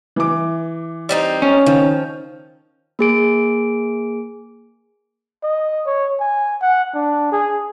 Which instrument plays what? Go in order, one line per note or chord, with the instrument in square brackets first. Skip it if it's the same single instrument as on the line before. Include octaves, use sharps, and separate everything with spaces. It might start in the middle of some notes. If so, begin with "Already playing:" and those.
[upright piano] E3 D6
[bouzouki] G3 C4 D#4
[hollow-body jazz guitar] C#4
[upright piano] D#3 [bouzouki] F3
[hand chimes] A#3 G#4 D7
[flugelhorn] D#5
C#5
G#5
F#5
D4
G#4